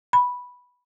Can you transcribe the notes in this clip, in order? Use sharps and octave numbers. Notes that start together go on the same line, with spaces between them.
B5